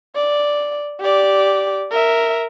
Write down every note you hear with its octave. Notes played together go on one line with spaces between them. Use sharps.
D5
G4 D5
A#4 E5